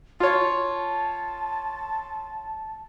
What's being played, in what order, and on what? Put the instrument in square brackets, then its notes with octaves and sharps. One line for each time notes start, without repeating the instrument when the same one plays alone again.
[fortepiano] F4 C#5 [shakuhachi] A5